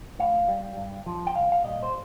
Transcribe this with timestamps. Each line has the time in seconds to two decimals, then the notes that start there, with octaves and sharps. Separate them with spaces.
0.19 A2 F5
0.48 G3
0.77 G2
1.06 F3
1.27 G5
1.35 C2 F5
1.52 F5
1.64 A#2 G3 D#5
1.83 C5